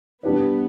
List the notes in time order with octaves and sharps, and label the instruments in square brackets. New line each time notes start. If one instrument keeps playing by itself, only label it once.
[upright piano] G3 D4 G4 B4 [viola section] B3